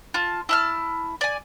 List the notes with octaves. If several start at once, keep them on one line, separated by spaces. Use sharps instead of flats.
F4 A5
E4 A5 F6
D5 G#5